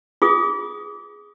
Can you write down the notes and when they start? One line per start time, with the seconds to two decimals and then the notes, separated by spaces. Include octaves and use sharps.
0.22 F4 G#4 D#6